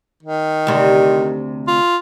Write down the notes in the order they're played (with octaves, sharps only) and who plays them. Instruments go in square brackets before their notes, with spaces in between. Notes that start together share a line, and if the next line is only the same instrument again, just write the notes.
[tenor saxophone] D#3
[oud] D2 C3
[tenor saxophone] F4